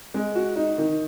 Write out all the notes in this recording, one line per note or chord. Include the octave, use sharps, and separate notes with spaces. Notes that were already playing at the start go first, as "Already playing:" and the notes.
G#3
F#4
D#4
D#3